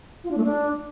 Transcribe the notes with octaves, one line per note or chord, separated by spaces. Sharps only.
F4
D4
A3
D4